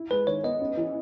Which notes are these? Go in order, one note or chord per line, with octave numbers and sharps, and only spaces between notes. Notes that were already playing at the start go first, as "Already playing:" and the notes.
Already playing: E4
G#3 B4
D#3 C#5
B3 D#5
C#4
E3